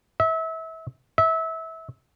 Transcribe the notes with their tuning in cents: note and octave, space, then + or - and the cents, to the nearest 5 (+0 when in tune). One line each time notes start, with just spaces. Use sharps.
E5 -30
E5 -25